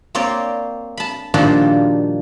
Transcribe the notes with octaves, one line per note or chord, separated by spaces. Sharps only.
A#3 C4 C#5 D5
A5 B5
A#2 D#3 F3 G3 D4 F#4